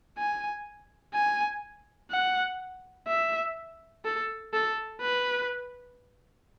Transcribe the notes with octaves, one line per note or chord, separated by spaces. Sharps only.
G#5
G#5
F#5
E5
A4
A4
B4